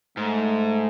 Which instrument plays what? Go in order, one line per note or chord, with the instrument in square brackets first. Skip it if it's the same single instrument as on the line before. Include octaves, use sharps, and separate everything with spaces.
[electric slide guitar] G#2 [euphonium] A3